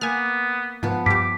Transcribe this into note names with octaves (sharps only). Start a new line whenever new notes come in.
A#3 B3 G#5 F6
G#2 F3 B3 B4
G2 G4 D6 B6